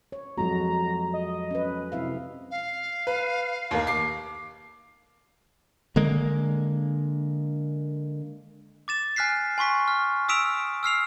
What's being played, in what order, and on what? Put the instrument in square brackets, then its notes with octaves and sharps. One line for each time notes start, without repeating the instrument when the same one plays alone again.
[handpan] C#5
[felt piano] F2 F3 [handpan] F#3 G#3 F#4 [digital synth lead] A#5
[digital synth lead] D#5
[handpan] C#4 B4
[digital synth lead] C3 [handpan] E4 E5 F5
[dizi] F5
[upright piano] B4
D#2 A#3
D6 C7
[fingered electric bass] D3 G#3 A#3
[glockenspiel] D6 A6 E7
G#5 F6 F#6 B6 C7
G#5 C6 C#6 B6
F6
D#6 E6 B6 D7 E7 F7
E6 F6 C7 F7